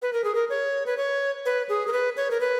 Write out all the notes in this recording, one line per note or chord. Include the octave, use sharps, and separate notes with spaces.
B4
A#4
G#4
A#4
C#5
B4
C#5
B4
G#4
A#4
B4
C#5
A#4
B4